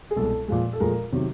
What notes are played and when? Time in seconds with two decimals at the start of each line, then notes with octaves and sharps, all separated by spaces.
0.11 G#4
0.16 C2 B2 G#3 A4
0.48 A#2 F3 G#3
0.73 A4
0.80 A#2 F3 G#3 A#4
1.12 C3 D#3 F#3